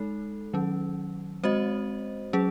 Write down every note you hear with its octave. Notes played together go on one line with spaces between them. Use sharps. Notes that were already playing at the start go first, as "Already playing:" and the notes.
Already playing: G#3 D#4 A4
D#3 F#3 C#4
G#3 C4 F#4 C5 D#5
F#3 C#4 G#4